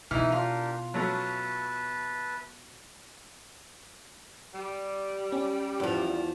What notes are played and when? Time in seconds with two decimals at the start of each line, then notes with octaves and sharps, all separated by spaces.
0.11 B2 E3 D#4 G4 G#5 F6
0.32 D4 F4 G4 A#4
0.94 F#3 A3 C#4 B4 E5 A5
4.54 G3
5.32 C#4
5.80 E2 F3